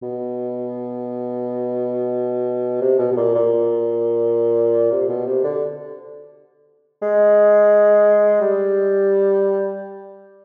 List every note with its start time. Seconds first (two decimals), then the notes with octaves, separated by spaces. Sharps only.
0.03 B2
2.81 C3
2.99 B2
3.12 B2
3.17 A#2
3.35 A#2
4.92 C3
5.09 B2
5.27 C3
5.44 D3
7.02 G#3
8.41 G3